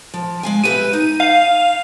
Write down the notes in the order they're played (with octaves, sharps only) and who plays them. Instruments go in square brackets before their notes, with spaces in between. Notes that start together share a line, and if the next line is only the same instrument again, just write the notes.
[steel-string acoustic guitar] F3
G#3 F5 G#5
[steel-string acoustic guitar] G4 B4 E5 [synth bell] D#7
[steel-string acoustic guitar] D#4
[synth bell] F5